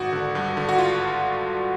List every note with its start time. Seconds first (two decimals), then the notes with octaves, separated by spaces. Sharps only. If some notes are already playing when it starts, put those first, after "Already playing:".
Already playing: G#1 F#4
0.13 D3
0.35 G2
0.57 D3
0.69 F#4
0.78 F4